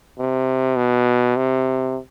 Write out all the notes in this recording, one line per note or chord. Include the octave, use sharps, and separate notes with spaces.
C3
B2
C3